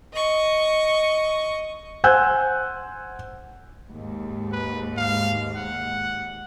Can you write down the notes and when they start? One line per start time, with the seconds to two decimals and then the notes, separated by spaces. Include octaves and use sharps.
0.13 D#5 C#6
2.04 C5 F#5 G#5 E6 F#6 G6
3.90 D#2 G#2
4.52 B4
4.97 F5
5.55 F#5